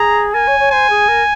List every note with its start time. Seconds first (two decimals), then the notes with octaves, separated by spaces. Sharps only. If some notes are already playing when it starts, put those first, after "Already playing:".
Already playing: G#4 A#5
0.34 A#4 G#5
0.47 C#5
0.59 C#5
0.71 C5 G#5
0.89 G#4
1.08 A#4